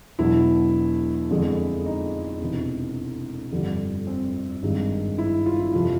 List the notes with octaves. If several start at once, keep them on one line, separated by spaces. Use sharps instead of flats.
E1 E2 B2 F#3 E4
F2 D3 F3 G#3
D#4
E1 E2 C3
G1 F2 D3 G3
C4
G#1 G2 D#3 G#3
E4
F4
E4
F2 C3 F3 F4